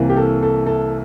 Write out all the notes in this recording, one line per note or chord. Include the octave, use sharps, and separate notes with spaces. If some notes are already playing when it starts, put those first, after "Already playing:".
Already playing: C2 C3 E3 A#3
G4
A4
A4
A4